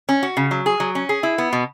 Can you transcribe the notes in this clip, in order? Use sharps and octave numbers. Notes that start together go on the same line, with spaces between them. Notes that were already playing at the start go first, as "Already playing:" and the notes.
C#4
F#4
C#3
F#3
G#4
F#3
C#4
G#4
E4
B3
B2